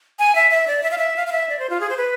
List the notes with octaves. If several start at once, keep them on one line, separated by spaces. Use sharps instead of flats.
G#5
E5
E5
D5
E5
F5
E5
F5
F5
E5
D5
C5
F4
G#4
C5
B4